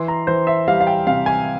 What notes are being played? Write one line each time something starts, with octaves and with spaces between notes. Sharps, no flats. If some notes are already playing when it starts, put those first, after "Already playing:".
Already playing: E3 C6
A#5
E3 C5
E5
G3 F5
F5
G5
C3 F5
G#5